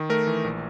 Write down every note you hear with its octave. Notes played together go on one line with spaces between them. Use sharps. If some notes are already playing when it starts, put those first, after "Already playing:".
Already playing: D#3
A3 A#4
E3
A#1